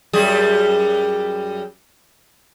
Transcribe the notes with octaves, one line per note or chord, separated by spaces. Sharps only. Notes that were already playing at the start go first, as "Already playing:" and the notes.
F#2 G3 G#4